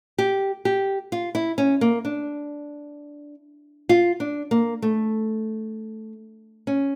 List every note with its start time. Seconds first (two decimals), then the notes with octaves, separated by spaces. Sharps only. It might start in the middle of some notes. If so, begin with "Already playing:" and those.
0.18 G4
0.65 G4
1.12 F4
1.35 E4
1.58 C#4
1.81 A#3
2.05 D4
3.89 F4
4.20 D4
4.51 A#3
4.82 A3
6.67 C#4